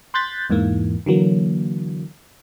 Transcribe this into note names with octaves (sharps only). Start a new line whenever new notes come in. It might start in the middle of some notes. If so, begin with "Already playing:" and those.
C6 F#6 G6 A6 B6
E2 G#2 E3 A#3
D3 E3 F#3 A#3